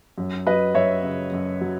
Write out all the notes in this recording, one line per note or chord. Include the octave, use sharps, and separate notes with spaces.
F#2
F#3 B4 D#5
F#2 C#5 E5
C#3
F#2
F#3